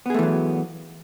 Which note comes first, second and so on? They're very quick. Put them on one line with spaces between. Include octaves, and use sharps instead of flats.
B3 G#4 A3 E3 F#3